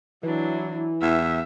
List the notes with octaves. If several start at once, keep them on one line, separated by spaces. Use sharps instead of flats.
E3 F#3 D4 E4
E2 E5